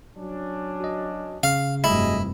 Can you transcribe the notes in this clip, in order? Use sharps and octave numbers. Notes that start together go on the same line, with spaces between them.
F#3 C#4 D4
F#4 D#5
C#3 F5
F1 G2 F#3 G3 A3 E4 G#4 D#5